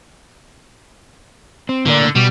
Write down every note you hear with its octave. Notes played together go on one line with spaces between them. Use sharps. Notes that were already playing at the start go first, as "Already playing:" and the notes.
C4
A2 D3 A#3 D5
B2 G3